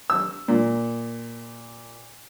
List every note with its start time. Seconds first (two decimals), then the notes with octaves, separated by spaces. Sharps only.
0.10 E6
0.48 A#2